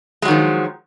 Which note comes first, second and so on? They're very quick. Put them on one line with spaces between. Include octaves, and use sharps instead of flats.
G#3 F#3 D#3 F3